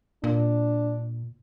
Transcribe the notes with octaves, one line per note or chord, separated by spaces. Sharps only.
A#2 D4